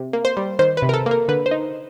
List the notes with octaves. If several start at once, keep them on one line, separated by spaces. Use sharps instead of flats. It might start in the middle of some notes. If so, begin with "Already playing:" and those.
Already playing: C3
A#3
C5
G3
D#3 C5
B4
C3
A#4
A4
A#3
A#4
D3 B4
C5
D#4